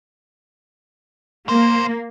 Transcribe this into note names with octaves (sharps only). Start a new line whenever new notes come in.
B1 A#3 C5